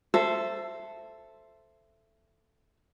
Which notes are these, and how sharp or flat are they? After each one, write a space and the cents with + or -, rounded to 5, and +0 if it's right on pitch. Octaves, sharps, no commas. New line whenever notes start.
A4 +0 C5 +0 E5 +20